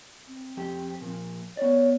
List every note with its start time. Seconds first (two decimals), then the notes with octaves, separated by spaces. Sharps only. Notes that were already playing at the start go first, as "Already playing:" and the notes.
0.28 C4
0.57 F2 G4
1.01 A#2 F3
1.57 B3 C#5 D5